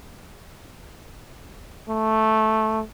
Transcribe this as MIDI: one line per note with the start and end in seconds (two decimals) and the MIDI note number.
1.89 2.81 57